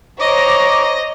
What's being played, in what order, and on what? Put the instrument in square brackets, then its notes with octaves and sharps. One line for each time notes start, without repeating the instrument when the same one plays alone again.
[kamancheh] C5 C#5 [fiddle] D#5 [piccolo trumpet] A#5 [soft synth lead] D6